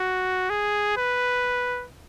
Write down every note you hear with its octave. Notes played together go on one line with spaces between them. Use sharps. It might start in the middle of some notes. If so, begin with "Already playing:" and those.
Already playing: F#4
G#4
B4